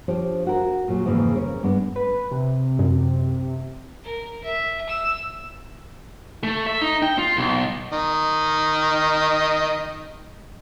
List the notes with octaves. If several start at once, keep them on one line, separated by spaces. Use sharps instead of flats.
F3 D4 G4 C5 C#5
F#4 A#4
A#2 F#3 G#4
F2 G#2 C#3 E3 G#3 A#3
C#4 A#4
G2 G#3 B3 D4
B4
C3
F#2
A#4
E5
E6
A3
E5
D#4
G5
F4
B1
D#3 D#5